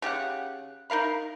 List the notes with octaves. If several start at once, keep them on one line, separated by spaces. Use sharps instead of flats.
C#3 G4 G#4 F#5
D#4 A#4 F5 B5